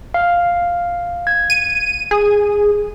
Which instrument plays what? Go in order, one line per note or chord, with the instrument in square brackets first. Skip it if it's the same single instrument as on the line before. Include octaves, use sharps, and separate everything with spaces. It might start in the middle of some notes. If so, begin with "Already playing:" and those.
[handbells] F5
G#6
[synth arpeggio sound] D#7
G#4